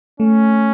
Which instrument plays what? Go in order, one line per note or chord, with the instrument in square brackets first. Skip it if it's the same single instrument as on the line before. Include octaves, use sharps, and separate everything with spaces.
[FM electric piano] A3 [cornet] C#4